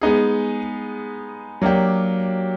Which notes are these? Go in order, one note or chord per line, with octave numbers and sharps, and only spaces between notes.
G#3 B3 D#4 G#4
F#3 A#3 D4 G4